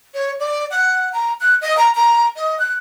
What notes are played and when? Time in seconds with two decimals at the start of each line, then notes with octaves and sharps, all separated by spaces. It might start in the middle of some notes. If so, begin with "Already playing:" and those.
0.14 C#5
0.40 D5
0.70 F#5
1.13 A#5
1.41 F#6
1.61 D#5
1.77 A#5
1.95 A#5
2.36 D#5
2.59 F#6